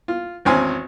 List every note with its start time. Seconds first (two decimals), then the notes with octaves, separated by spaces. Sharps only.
0.08 F4
0.45 G#1 E2 C4 C#4 G#5 C6